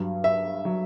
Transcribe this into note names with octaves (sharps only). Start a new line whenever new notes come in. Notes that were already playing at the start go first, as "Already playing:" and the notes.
Already playing: G2 F#3
E5
F#3